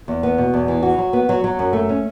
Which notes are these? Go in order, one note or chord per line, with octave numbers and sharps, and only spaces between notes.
E2
B3
B2
E2
E3
F#4
F#3
B3
F#3
F#3
F#2
A3
C#4